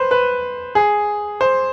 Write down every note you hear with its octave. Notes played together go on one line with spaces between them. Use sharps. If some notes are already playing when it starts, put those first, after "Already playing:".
Already playing: B4 C5
B4
G#4
C5